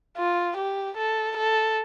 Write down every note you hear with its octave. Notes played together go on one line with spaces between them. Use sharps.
F4
G4
A4
A4